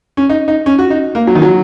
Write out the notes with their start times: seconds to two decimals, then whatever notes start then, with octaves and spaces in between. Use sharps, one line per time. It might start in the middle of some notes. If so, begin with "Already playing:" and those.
0.17 C#4
0.29 D#4
0.48 D#4
0.66 C#4
0.79 F#4
0.90 D#4
1.15 A#3
1.27 F#3
1.35 D#3
1.42 F#3